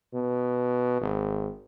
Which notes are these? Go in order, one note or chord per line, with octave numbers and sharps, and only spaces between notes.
B2
G#1